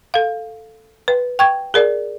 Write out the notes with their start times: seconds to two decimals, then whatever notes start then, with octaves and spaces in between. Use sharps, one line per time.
0.14 A4 F5
1.08 B4
1.39 G5 C#6 G#6
1.74 G#4 A#4 D5